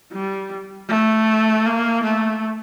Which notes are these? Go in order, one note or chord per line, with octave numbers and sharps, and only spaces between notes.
G3
A3
A#3
A3